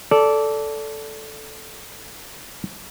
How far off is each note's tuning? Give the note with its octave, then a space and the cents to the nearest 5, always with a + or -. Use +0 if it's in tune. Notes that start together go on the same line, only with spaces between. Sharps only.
A4 -5 D5 -15